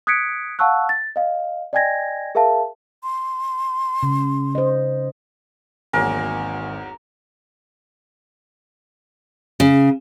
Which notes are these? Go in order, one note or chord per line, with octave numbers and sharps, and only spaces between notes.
D#6 F#6 G#6 B6 C#7 D7
F5 F#5 A5 C#6 E6 F#6
A6
D#5 F5
D5 D#5 G5 G#5 G#6 A#6
G#4 A#4 E5 F5 A5
C6
C#3
C5 D#5
G#1 E2 F#3 A#3 A#4 G#5
C#3